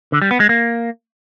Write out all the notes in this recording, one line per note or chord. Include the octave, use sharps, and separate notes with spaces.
D3
G3
B3
G#3
A#3